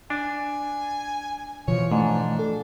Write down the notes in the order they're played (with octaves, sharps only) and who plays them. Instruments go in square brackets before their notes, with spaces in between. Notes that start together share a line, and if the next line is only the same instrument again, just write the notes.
[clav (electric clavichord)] D4 [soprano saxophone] G#5
[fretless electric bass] B2 E3 F3 [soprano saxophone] C#5
[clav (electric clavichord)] G#2 [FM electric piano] A3 [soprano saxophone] D4
[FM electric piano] A4